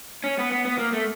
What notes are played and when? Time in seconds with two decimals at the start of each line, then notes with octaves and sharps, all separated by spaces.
0.24 C#4
0.38 B3
0.52 B3
0.65 B3
0.78 A#3
0.93 A3